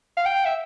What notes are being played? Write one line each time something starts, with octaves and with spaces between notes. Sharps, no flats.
F5
G5
E5